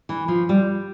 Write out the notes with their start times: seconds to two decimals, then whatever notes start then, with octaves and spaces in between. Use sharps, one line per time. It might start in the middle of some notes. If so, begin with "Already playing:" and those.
0.09 E3
0.28 F3
0.49 G3